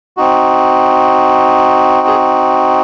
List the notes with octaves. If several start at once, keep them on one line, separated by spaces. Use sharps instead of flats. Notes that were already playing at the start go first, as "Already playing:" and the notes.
C4 D#4 F#4
G#4